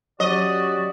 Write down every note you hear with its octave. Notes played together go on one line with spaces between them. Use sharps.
F#3 C#4 F#4 G4 D5 D#5